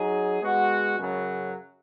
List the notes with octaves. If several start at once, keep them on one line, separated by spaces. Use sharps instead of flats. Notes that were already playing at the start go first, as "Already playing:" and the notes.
Already playing: F#3 D#4 G#4
G#3 B3 F#4
F#2 C#3 F#3